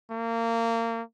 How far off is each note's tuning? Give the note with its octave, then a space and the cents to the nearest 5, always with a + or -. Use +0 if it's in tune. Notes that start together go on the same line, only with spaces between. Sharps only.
A#3 -25